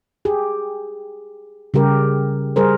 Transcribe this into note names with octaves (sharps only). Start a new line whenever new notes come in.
G4 G#4
C#3 G3 G4 A#4
G3 G#4 A#4 C5